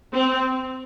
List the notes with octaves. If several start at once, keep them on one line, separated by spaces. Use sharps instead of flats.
C4